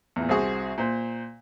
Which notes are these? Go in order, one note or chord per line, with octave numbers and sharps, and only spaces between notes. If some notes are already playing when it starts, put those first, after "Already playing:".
E2 A#2
C2 C4 F#4 G#4 C#6 D#6
A#2 C5